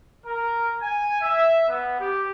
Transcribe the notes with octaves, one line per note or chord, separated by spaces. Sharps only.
A#4
G#5
E5
B3
G4